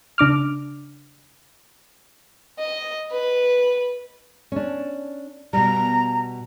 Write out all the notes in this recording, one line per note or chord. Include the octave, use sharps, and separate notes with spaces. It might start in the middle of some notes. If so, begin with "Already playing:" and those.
C#3 D4 D6 F6
D#5
B4
C#4 D4
B2 G3 A#5